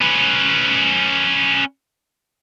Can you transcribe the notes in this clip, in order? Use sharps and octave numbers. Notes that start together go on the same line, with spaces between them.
C#4 B4